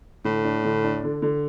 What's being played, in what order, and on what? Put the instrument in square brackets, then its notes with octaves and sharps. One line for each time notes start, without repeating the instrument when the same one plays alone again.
[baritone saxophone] A2 [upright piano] D3
[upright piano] D4
D3
D4
D3
D3